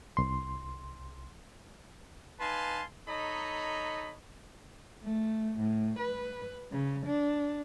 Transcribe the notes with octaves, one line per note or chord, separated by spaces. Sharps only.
C2 C6
D#4 B4 F5 G#5 A5 C6
D#4 A4 C#5 D#5 A#5 B5
A3
A2
B4
C#3
D4